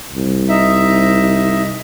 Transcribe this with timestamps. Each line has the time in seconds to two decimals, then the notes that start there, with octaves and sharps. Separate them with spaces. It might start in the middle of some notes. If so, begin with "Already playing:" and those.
0.13 C2
0.49 D#4 E5